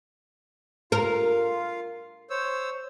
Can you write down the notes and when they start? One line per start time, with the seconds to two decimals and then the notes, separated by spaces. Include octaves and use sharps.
0.92 F4 A#4 F5
2.30 C5 C#5 E6